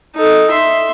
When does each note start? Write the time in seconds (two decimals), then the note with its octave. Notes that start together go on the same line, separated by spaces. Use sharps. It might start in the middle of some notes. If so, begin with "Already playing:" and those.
0.16 D#4 A4
0.51 E5 C6